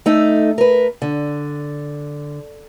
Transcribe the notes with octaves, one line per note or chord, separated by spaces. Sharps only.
A3 D#4 A4
A#4 B4
D3